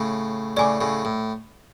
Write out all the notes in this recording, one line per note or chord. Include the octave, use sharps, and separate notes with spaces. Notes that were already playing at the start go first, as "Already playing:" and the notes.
Already playing: A2 C#3
A2 C#3 D5 G#5 D6
A2 C#3
A2